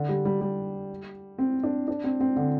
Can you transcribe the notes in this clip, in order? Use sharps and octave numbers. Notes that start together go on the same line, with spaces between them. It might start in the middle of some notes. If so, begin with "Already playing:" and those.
Already playing: D3
G3
G3
G3
C4
D4
D4
C4
C4
D3